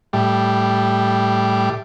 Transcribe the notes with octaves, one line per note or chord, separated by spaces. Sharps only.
A2 G3